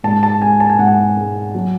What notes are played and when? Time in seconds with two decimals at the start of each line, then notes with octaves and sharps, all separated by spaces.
0.04 G#2 A5
0.23 A5
0.42 G#3 G#5
0.60 A5
0.70 G#5
0.79 G#2 F#5
0.88 G#5
1.17 G#3
1.55 F#3